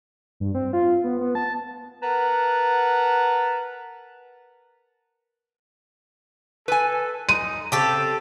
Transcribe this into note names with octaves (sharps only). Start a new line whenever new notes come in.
G2
C4
F4
B3
B3
A5
A#4 B4 F#5 A5 A#5
A4 B4 G#5
D#4 D#7
C#3 C4 G4 A4 A5